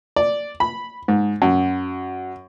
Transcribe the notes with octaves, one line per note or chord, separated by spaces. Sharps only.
D5
B5
G#2
F#2